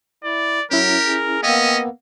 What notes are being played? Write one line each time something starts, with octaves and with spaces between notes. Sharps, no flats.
E4 D5
F#3 C#4 E4 G4 A#4
G#4
A#3 B3 C#4 D#5 F5 G5 E6